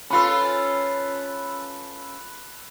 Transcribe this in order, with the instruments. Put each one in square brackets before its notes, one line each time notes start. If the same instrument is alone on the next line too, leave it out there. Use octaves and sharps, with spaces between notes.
[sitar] C#4 F4 [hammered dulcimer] A4 B4 B5